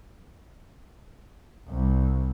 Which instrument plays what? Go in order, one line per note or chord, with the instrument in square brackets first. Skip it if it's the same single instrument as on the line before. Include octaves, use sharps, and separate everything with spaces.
[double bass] C2